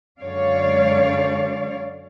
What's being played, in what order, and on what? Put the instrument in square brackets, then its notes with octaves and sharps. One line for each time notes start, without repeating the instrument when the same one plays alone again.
[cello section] F#2 D3 G#3 C#5 D5 F5